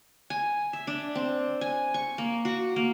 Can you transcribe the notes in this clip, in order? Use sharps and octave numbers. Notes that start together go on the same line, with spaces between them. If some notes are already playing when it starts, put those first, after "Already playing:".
G#5
E5
D4
C4
G#5
C#6
A#3
F#4
A#3